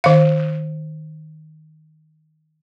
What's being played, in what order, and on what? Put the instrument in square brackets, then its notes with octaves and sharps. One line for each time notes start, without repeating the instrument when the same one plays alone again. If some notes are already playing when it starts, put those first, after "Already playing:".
[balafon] D#3 F5